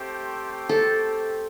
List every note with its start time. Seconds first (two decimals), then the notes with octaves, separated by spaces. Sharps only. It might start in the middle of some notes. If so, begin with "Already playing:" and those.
Already playing: A3 C4 G4 C5 G5
0.69 A4